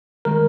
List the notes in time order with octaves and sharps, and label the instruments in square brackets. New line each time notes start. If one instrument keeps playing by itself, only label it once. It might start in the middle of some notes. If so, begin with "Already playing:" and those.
[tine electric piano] D#3 G#3 A#4